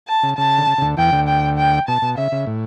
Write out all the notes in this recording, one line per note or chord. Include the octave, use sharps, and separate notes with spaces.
A5
C#3
C#3 A5
D3
C#3
C#3
D2 D3
E2 E3 G5
D2 D3
G5
G5
B2 A5
B2
C#3 E5
C#3
A2